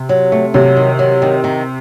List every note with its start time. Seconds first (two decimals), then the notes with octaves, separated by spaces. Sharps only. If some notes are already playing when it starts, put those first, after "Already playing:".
Already playing: C3
0.09 F#3
0.32 A3
0.54 C3 F#3
0.77 D#3
0.99 F#3
1.22 D#3
1.44 D#3